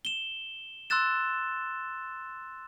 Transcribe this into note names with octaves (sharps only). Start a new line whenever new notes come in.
E7 G7
C6 E6 F#6 A6 E7